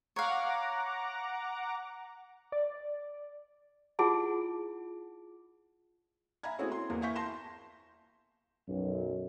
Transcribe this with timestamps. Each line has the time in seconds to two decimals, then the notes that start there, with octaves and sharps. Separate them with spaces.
0.16 C#5 F5 F#5 A#5 D6
2.52 D5
3.99 E4 F4 G#4 F#5 A5
6.43 E5 F5 G#5 A#5 B5 G#6
6.59 A3 C4 C#4 E4 F#4 G#4
6.72 C6
6.90 E2 E3 A#3
7.02 E5 F5 G#5 C#6 G6 B6
7.15 A5 C6 A#6 E7
8.68 B1 F#2